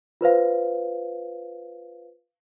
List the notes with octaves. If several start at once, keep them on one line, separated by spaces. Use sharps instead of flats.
F4 B4 C5 F5